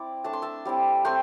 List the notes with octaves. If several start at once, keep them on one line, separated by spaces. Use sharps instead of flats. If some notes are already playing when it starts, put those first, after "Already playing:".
Already playing: C4 E4 D5
A3 D4 A5
C6
E5 A5
G3 C4 E4
A3 C4 G5 C6